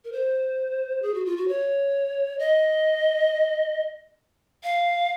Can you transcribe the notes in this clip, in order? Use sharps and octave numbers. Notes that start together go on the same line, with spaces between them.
A#4
C5
G#4
F#4
F4
F#4
C#5
D#5
F5